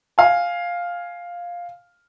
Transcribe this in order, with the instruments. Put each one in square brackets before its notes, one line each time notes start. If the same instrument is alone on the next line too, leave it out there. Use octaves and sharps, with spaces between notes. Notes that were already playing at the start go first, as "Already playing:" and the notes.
[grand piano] F5 G#5